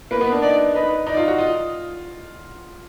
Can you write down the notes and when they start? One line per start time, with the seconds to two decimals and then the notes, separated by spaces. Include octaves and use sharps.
0.11 A#3 B4
0.21 B3
0.32 D4
0.42 D#4 D5
0.75 D#4 B4
1.06 D#4 D5
1.17 F4
1.28 F#4
1.38 F4 D#5